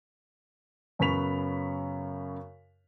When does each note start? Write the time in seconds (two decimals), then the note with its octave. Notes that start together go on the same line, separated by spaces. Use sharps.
0.99 F#2 C#3 B3 C#6 B6 F7